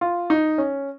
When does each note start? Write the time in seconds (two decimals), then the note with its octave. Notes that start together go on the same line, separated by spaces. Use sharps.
0.01 F4
0.30 D#4
0.58 C#4